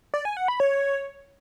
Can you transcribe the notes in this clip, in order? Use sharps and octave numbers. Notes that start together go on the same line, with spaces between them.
D5
G#5
F#5
B5
C#5